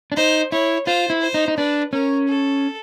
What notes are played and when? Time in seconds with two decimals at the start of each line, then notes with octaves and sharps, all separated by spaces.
0.12 D4
0.16 D#4 C5
0.52 E4 C#5
0.86 F4 C5
1.10 E4
1.22 C5
1.34 D#4
1.48 D#4
1.57 D4 B4
1.92 C#4 A#4
2.28 A4